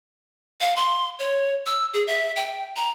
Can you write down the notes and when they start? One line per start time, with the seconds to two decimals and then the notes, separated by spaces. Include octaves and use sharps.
0.61 F5
0.76 C6
1.19 C#5
1.66 E6
1.94 G#4
2.07 E5
2.36 G5
2.76 A#5